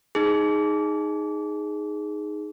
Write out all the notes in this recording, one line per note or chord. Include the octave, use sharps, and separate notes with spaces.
D#4 G#4